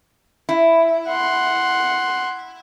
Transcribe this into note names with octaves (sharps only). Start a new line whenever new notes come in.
E4
F#5 C6